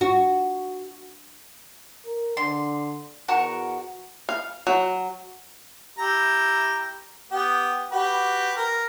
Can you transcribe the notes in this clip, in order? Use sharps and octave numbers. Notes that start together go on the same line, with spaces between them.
F#4
A#4
D3 C6
E2 F#4 A#4 C#6
F5
F#3
E4 G4 A#5
B3 G4
F#4 G4 B4
A#4